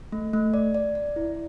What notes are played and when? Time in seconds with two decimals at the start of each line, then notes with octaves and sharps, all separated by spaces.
0.12 A3
0.33 A3
0.54 D5
0.75 D5
0.95 D5
1.16 E4